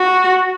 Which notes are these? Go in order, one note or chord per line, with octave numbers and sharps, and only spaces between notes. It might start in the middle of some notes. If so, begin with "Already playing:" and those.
Already playing: F#4